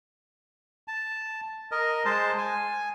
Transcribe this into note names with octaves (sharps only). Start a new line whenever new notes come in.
A5
A#4 D#5
G#3 C5 A5
G#5